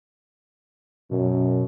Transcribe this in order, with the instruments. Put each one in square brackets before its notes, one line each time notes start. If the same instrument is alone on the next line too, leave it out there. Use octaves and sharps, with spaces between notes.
[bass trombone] F#2 [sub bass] B2